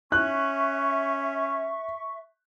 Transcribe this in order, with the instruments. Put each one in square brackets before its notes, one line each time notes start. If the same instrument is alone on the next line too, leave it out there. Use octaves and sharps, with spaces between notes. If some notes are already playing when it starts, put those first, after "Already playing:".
[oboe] C#4 [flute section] E5 C#6 [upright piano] F#6